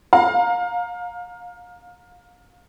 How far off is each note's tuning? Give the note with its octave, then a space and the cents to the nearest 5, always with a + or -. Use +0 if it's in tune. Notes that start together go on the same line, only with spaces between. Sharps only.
F5 +30 A#5 +0